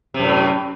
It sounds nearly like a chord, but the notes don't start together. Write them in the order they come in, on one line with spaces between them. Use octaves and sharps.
C3 F#2 A2